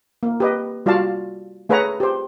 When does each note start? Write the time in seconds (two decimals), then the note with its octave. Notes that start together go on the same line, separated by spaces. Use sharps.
0.23 A#3
0.40 G4 B4 D#5
0.86 G3 F4 F#4 D5 F5 A5
1.69 A3 G#4 B4 C#5 F#5 A#5
2.00 G4 C5